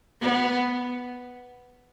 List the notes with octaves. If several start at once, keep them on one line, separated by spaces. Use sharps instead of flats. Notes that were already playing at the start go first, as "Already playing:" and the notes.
B3